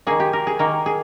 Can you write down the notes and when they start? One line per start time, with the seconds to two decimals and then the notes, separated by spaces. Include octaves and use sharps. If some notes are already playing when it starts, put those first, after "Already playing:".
0.07 D#3 A#3 G#4
0.20 G4
0.33 A#4
0.47 G#4
0.59 D#3 A#3 A#4
0.86 G#4